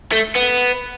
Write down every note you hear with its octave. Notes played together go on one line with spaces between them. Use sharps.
A3
B3